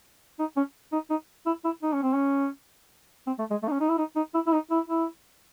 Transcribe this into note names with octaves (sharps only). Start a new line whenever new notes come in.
D#4
C#4
D#4
D#4
E4
E4
D#4
C#4
C4
C#4
C4
A3
G#3
A3
D#4
C#4
D#4
E4
D#4
D#4
E4
E4
D#4
E4
E4